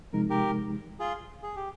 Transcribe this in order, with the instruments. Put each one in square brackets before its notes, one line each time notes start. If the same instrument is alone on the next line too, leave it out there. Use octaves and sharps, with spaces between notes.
[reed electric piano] C3 F3 G#3 D#4 [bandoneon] A#4
[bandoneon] G4 A#4
F4 G#4
G#4
G4